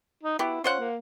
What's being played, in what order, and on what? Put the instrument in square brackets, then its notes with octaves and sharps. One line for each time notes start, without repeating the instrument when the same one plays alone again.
[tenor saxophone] D#4
[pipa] B3 F#4 G4 [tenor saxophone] E4
[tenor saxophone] C#4 [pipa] F4 C5 F#5
[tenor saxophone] A#3